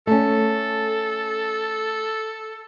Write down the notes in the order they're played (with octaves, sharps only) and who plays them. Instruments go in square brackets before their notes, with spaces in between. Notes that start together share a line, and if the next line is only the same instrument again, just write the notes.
[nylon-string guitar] A3 C#4 [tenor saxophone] A4